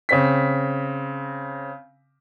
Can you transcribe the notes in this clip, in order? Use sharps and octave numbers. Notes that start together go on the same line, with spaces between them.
C#3 C4 B6